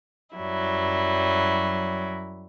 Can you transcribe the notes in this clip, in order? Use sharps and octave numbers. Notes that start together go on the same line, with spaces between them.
F#2 F#3 G3 E4